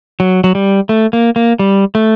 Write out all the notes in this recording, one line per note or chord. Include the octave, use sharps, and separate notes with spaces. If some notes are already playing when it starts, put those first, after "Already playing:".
F#3
F#3
G3
A3
A#3
A#3
G3
A3